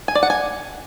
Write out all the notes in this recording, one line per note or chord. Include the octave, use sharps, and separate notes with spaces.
G#5
D5
F#5
G#5